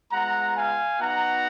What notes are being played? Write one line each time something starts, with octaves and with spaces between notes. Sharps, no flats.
G#3 B3 F4 F#5 A#5
F5 G#5
B3 D#4 F#4 F#5 A#5